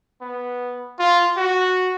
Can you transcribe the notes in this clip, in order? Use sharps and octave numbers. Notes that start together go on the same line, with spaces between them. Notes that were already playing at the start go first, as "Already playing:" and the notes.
B3
F4
F#4